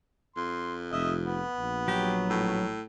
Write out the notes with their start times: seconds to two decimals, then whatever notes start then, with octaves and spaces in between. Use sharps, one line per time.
0.36 F2 C6
0.92 F1 D#5 E5
1.25 B3
1.57 A#1
1.88 F#3 G4
2.30 A2